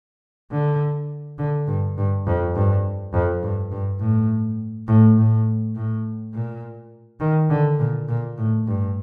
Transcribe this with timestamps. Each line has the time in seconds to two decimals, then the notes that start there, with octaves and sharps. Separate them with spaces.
0.51 D3
1.38 D3
1.67 G2
1.97 G2
2.27 F2
2.55 G2
3.14 F2
3.43 G2
3.72 G2
4.00 A2
4.88 A2
5.17 A2
5.76 A2
6.34 A#2
7.20 D#3
7.50 D3
7.79 A#2
8.09 A#2
8.38 A2
8.67 G2